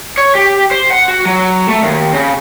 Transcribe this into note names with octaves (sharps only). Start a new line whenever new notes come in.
C#5
G4
C5
F#5
F#4
F#3
A3
D#2
C#3